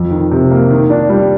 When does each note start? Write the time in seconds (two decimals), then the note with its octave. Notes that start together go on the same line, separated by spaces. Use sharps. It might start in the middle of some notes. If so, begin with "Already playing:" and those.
Already playing: F2
0.11 D#3
0.32 C3
0.51 A#3
0.70 D#3
0.90 D4
1.10 G3